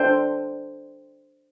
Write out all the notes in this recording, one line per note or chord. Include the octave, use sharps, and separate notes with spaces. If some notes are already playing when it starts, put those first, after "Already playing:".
Already playing: D4 A4 C5 G5